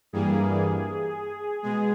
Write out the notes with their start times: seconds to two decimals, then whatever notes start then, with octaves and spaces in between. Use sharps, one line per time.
0.13 G2 E3 G3 A#3 G#4
1.63 B2 G#3 G#4